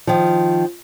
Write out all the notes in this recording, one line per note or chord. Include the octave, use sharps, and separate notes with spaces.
D#3 F3